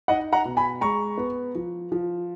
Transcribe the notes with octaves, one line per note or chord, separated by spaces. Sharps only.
D#4 D#5 F#5
F#5 A#5
B2
G#5 B5
G#3 A#5 C#6
B3
F3
F3